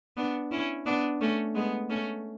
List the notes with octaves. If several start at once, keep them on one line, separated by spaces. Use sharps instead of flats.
B3 D4
C#4 E4
B3 D4
A3 C#4
G#3 B3
A3 C#4